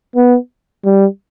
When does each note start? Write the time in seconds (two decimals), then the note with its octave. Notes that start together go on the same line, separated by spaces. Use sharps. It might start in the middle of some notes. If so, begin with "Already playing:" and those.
0.16 B3
0.85 G3